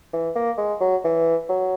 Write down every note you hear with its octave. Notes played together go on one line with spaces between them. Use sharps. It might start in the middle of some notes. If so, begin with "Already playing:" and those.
E3
A#3
G#3
F#3
E3
F#3